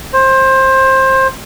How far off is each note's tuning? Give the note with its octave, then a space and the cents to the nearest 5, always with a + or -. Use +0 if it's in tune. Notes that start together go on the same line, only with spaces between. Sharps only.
C5 +20